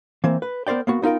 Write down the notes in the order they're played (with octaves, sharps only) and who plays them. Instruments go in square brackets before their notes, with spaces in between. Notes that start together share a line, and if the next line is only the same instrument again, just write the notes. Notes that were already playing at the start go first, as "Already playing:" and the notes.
[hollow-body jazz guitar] E3 A#3 C4
B4
B3 A#4 C5 D5 G5
A#3 B3 F#4
B3 D#4 F4 A#4 G5